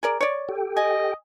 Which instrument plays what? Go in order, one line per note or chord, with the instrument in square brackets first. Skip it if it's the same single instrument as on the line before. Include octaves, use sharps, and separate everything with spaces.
[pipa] G#4 A#4 D5
C#5 D5
[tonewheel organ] G4 A4 G5
[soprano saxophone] D#5 [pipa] G#5